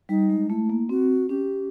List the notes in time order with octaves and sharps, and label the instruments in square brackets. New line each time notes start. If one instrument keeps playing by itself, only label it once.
[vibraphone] G3 [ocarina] D#4
[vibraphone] G#3
[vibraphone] A3 [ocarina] E4
[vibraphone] A#3
[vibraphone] C4 [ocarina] F#4
[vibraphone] C#4 [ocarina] G4